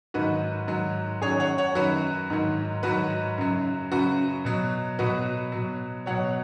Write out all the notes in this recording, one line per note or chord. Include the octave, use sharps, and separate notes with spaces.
G#2 D#3 F#3 F#4 B4
G#2 D#3 F#3
F#2 D#3 F#3 G#4 C#5
C#5 F#5
C#5 F#5
F#2 D#3 F#3 F#4 B4
G#2 D#3 F#3
G#2 D#3 F#3 F#4 B4
F#2 C#3 F#3
F#2 C#3 F#3 F#4 B4
B2 F#3
B2 F#3 F#4 B4
B2 F#3
B2 F#3 C#5 F#5